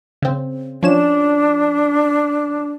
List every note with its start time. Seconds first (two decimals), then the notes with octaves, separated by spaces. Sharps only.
0.22 C#3 C4
0.83 F3 C#4 D4 E7